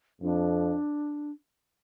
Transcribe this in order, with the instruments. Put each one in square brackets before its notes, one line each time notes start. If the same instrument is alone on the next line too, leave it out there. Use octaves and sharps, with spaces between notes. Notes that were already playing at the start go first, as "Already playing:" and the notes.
[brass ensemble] F2 [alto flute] D4